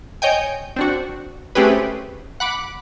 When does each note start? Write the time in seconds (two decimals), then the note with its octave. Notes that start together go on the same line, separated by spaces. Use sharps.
0.22 C#5 D#5 G5 G#5
0.76 C4 D4 F#4
1.55 A3 C4 C#4 G4 G#4 B4
2.40 F#5 B5 D6